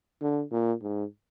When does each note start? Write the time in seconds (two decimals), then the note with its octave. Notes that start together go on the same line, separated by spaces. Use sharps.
0.21 D3
0.51 A#2
0.82 G#2